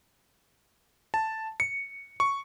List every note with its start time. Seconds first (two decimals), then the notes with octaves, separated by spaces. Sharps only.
1.14 A5
1.60 C#7
2.20 C#6